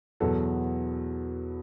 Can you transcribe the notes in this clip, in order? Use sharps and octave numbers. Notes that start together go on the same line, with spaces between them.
E2 B2 F#3 B3 A4